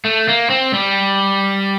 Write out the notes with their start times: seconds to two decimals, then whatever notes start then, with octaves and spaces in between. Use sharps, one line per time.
0.05 A3
0.28 A#3
0.50 C4
0.73 G3